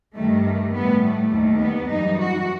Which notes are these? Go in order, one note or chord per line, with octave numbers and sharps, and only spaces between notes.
G2 D#3 G3 A3
A3
A2 G3 B3
A3
D#2 D#3 G3
B3
F#2 E3 G3 D#4
F#4